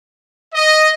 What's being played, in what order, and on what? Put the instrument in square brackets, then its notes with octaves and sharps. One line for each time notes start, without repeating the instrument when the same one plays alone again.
[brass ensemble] D#5